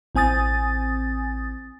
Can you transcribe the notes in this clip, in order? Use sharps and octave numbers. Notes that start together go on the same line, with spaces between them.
A1 C4 G#5 D#6 A6